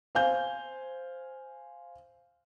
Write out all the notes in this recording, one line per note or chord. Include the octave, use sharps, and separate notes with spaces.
C5 F5 G#5 G6